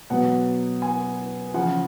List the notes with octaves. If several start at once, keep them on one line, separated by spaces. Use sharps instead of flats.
B2 F#3 F#5
G#5
C#3 F3 F#5